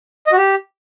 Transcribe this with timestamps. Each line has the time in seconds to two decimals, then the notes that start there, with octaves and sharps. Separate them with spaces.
0.27 D#5
0.32 F#4
0.37 G4